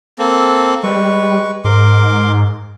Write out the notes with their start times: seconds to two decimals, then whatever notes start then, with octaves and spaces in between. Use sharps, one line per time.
0.19 A#3 C4 A4
0.83 G3 G#3 B4 C#6
1.64 G#2 A#4 C6 D6